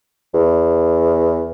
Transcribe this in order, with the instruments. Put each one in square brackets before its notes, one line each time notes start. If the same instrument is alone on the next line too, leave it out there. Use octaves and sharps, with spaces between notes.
[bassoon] E2